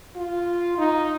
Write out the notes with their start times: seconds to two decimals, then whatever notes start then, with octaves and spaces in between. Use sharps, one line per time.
0.16 F4
0.78 D#4